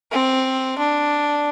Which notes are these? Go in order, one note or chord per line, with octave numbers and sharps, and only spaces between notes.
C4
D4